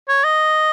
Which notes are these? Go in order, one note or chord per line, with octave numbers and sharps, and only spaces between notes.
C#5
D#5